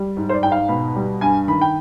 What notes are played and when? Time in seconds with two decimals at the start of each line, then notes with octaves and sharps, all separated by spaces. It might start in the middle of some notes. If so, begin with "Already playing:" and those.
Already playing: G3
0.17 G#2
0.29 C5
0.34 D5
0.43 G#2 G5
0.52 F5
0.68 B2 B5
0.96 G3
1.21 G2 G#5
1.48 D#3 B5
1.61 G5